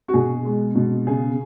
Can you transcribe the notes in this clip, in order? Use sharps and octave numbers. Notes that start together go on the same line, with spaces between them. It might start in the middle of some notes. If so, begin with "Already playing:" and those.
F#4
B2 G#4
G#3
B2
C#3 G#4